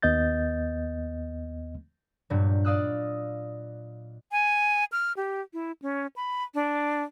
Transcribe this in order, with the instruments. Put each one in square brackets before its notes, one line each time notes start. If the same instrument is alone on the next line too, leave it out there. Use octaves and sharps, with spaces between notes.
[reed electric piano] D#2 B3 D#5 G6 A6
[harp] G2 A#2 F#3 G3
D5 D#5 F5 D#6 E6 F#6
[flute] G#5
F6
G4
E4
C#4
B5
D4